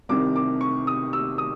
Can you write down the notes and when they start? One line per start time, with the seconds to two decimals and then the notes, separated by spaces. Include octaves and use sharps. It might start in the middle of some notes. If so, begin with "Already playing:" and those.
0.09 C2 C3 D#3 D6
0.36 D6
0.61 C#6
0.87 D#6
1.13 E6
1.38 D#6